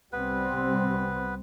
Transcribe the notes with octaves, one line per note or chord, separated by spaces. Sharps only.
C2 G3 B3 C4 B4